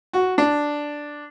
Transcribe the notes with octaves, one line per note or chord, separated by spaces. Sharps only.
F#4
D4